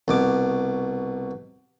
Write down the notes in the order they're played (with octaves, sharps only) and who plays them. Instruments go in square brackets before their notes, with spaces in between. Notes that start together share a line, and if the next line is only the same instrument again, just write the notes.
[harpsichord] C2 B2 D6